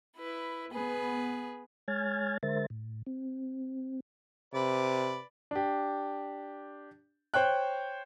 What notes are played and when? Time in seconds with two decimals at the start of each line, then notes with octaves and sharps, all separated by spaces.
0.16 E4 B4
0.71 B3 G#4 B4
1.88 G#3 C#5 G#5 F6 G#6 A6
2.43 D3 G#3 A#4 C5 E5 A6
2.70 A2
3.07 C4
4.54 C3 B4 D5 B5
5.51 D4 G4
7.34 C5 C#5 G5 F#6